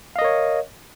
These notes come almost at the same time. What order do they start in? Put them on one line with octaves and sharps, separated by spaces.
F5 D#5 A#4 C#5